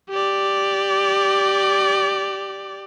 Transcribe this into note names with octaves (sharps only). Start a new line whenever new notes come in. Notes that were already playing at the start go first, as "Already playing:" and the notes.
G4 D5